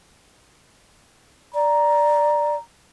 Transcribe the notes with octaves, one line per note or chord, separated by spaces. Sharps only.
D5 A#5